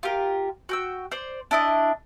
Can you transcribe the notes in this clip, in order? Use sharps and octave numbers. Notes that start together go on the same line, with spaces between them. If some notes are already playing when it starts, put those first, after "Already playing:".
F4 G4 A#4
F#4 G5 E6
C5 D5
D4 E4 D#5